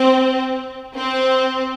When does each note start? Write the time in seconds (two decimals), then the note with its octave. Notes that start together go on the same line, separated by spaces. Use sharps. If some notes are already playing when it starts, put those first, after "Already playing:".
Already playing: C4
0.95 C4